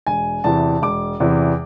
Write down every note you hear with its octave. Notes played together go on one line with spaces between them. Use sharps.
E1 G#5
E2 C3 E3 A5
E1 D6
E2 C3 E3